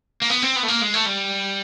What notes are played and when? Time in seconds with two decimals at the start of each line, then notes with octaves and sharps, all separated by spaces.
0.22 A#3
0.30 B3
0.42 C4
0.56 B3
0.63 A3
0.68 A#3
0.82 G#3
0.94 A3
1.06 G3